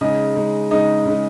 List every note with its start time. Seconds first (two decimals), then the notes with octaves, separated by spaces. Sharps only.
0.01 C#3 G#3 D#4 D#5
0.36 C#3 G#3 D#4
0.71 C#3 G#3 D#4 D#5
1.05 C#3 G#3 D#4